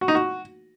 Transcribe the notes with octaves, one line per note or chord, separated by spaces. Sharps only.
F#4
D#4
F#4